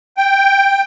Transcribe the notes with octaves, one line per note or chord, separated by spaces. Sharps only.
G5